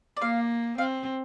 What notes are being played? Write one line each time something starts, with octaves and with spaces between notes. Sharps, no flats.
D5
A#3 F5
C4 F5